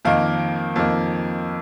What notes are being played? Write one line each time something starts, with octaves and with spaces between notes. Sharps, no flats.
F2 D#3 A#3 F5
F2 D#3 A#3